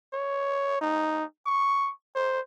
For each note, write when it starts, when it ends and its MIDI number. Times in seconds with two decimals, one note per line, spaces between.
0.13 0.79 73
0.81 1.24 63
1.46 1.91 85
2.15 2.40 72